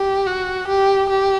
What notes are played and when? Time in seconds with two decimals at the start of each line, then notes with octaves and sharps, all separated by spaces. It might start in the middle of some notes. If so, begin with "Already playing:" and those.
Already playing: G4
0.27 F#4
0.68 G4
1.10 G4